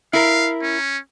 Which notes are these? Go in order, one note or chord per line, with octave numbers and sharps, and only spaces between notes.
E4 A#4 F5
C#4